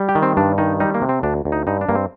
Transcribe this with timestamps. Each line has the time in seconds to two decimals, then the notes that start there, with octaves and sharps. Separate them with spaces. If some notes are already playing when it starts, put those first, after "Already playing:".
Already playing: G3
0.09 G4
0.15 D#3
0.23 C4
0.37 G2 D4
0.58 D#3 D#4
0.80 G3 D#4
0.94 A#3
1.02 C3
1.09 C4
1.23 D2 D4
1.45 D2
1.52 D#4
1.67 G2 D#4
1.81 D4
1.89 G2 A#3
1.95 C4